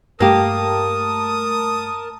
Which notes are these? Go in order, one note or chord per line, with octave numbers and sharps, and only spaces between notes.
G2 A3 A#3 G4 A#4 A5 D#6